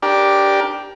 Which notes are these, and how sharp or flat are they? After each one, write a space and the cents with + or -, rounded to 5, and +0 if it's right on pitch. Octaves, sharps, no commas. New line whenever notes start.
D4 +0 G4 +0 A#4 +25